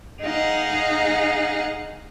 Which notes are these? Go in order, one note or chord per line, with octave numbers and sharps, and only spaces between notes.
D#4 G#4 D#5 F5 F#5